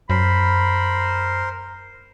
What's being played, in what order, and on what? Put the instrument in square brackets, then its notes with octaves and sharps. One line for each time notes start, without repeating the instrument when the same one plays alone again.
[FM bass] F#2 [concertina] A#4 C5 [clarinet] B5